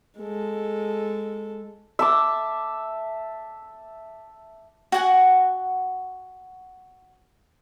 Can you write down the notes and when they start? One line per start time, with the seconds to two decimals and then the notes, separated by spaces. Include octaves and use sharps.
0.19 G#3 A4
1.99 E5 A5 D6
4.92 F#4 F#5 G#5